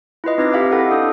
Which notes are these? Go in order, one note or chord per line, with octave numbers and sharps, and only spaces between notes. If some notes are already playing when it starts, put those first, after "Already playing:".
E4 F4 B4 D#5
C4 D#4 B4 D6 A#6
G4 E5 F5 G5 D6
E4 A4 F#5
D4 A4 D#6